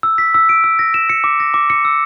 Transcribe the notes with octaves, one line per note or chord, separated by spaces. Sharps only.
E6
B6
E6
D7
E6
A#6
E7
C#7
D6
A#6
D6
C#7
E6